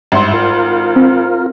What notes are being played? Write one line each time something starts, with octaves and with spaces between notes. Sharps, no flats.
G#1 G2 E5 C6
F4 A#4
C4